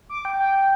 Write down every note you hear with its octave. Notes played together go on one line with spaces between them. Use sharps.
D6
G5
G5